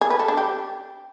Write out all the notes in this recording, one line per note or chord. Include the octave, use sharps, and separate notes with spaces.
G#4
B4
A4
D4
G4